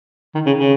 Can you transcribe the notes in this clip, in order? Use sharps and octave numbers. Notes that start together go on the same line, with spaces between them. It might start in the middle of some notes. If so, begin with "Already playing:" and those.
D#3
C#3
C#3